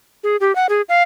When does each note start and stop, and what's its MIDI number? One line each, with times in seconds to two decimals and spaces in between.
0.24 0.37 68
0.40 0.55 67
0.55 0.67 78
0.69 0.82 68
0.89 1.03 77